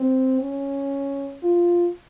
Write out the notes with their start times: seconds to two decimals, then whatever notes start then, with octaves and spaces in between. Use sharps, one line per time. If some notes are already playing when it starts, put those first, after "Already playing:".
Already playing: C4
0.41 C#4
1.43 F4